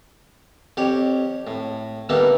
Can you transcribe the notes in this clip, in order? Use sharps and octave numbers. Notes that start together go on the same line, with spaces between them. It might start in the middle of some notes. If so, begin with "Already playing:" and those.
F2 G4 C#5
A2
D3 G3 A#3 B3 D#4 E4